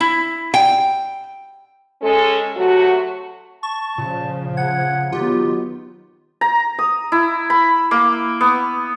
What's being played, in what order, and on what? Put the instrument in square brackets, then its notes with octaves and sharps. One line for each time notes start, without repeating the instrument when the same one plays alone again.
[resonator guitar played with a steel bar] E4
G5
[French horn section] G#3 C#4 A4
C3 F#3 A3 F#4
[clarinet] A5 [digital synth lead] C#6
[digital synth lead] A#2 [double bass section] C#3 F3
[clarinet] F#5 [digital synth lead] G#6
[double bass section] D#3 F#3 B3 [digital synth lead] F4 [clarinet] G4
[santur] A#5
D#6
E4
B5
A#3
B3